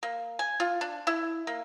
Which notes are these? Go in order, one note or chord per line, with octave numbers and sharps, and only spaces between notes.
A#3
G#5
F4
D4
E4
A#3